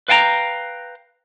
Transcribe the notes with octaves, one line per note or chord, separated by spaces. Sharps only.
B4 F5 G5 A5 A#5